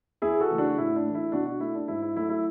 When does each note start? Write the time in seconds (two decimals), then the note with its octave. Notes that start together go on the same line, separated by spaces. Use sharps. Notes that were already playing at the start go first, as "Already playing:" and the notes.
0.22 E2 E4 G#4
0.40 F#4 A4
0.50 C#3 E3 A3
0.58 D4 F#4
0.78 A2 E4
0.96 D4
1.04 E3 A3
1.15 E4
1.32 B2 D4 F#4
1.46 D4 F#4
1.60 A3 E4
1.75 D4
1.88 G#2 E4
2.02 E4
2.15 F#3 A3 E4
2.30 E4